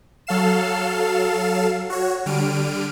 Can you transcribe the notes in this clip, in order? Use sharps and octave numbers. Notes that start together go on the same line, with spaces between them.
F#3 A4 F5 C7 E7
F#4 C#5
D3 G3 F6 D7 D#7